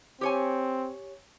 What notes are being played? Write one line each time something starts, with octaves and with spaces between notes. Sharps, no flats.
C4 G4 C#5 G#5